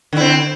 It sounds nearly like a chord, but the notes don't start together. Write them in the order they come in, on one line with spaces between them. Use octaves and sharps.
D3 E4 C4